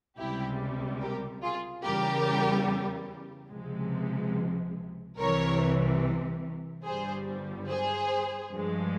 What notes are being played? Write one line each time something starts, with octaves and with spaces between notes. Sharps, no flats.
C#2 C3 G3 E4 G4
G4 A#4
F4 G#4
E2 C#3 G3 G4 A#4
C#2 C3 F3 G#3
C2 C3 E3 A#4 C#5
G1 G2 G3 G#4 C5
G#4 C5
G2 F3 G#3